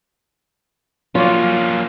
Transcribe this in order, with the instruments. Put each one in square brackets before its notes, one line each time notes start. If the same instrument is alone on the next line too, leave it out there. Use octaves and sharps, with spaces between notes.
[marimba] F3 F5 [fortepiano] F#3 C#5 D5 [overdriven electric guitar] A#3 C#4 [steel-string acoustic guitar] F4